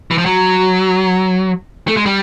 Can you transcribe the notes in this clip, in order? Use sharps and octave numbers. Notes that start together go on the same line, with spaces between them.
E3
F3
F#3
A3
G#3
G3